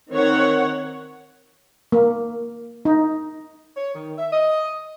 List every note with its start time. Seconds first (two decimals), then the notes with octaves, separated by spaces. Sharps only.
0.10 D#3 C4 C#5 F#5
1.92 A#3
2.85 D#4
3.77 C#5
3.95 D#3
4.18 E5
4.33 D#5